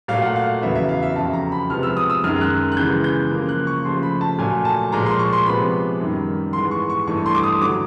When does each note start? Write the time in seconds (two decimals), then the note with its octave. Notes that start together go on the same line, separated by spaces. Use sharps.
0.08 A#2 F#3 A3 F5
0.22 F#5
0.36 F5
0.61 E2 C#3 F#3 B3 E5
0.75 E5
0.89 F5
1.03 E5
1.16 F2 C#3 F#3 A5
1.33 A#5
1.52 B5
1.69 C3 F3 G#3 B3 F6
1.83 E6
1.97 D#6
2.10 E6
2.24 F#2 D#3 G#3 F6
2.41 F#6
2.72 F#6
2.77 C#3 E3 G#3 B3 G6
3.04 G6
3.31 C#3 F3 A#3
3.49 F#6
3.67 C#6
3.85 C#3 F3 A3 C6
4.03 B5
4.21 A5
4.38 A#2 F#3 A3 G#5
4.65 A5
4.92 A#2 F3 G#3 A#5
5.06 C6
5.19 C#6
5.33 C6
5.46 C3 F3 G#3 B3 B5
6.00 F#2 D#3 G3
6.53 G#2 E3 G#3 B3 C6
6.71 C#6
6.90 C#6
7.07 G2 E3 A3 C#6
7.26 C6
7.35 D6
7.43 D#6
7.61 D3 F#3 D6